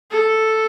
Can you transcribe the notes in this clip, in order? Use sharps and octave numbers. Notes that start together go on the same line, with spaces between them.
A4